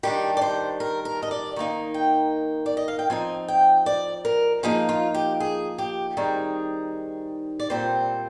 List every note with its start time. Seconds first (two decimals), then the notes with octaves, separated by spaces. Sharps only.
0.03 D#3 G3 D4 G4
0.37 D5
0.42 C5
0.80 A#4
1.05 A#4
1.22 D#5
1.31 D5
1.56 D#3 A#3 D#4
1.94 G5
2.66 D5
2.77 D#5
2.88 F5
2.99 G5
3.10 F3 C4 D#4 G#5
3.48 G5
3.86 D5
4.25 A#4
4.63 F3 A#3 D#4 G#4
4.89 F4
5.14 G4
5.40 G#4
5.78 G4
6.17 D#3 G3 C4 D#4 G#4
7.60 D5
7.70 A#2 G3 C4 C5